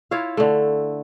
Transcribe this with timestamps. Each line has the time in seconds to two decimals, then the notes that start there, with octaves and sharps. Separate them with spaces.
0.11 E4 F4 C#5 F5
0.37 D3 A3